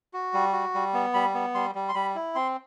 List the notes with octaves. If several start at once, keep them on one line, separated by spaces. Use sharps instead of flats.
F#4
G3
F#4
G3
B3
G3 B5
B3
G3 C6
G3
C6
G3 B5
E4
C4 C6